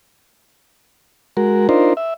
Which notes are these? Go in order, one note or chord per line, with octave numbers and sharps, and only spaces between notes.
G#3 F#4 A#4
D4 D#4 F4 A#4 C5
E5